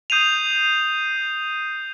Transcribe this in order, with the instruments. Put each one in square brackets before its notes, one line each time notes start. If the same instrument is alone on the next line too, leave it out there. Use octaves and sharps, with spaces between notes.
[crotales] D#6 G6 C7 D#7 F7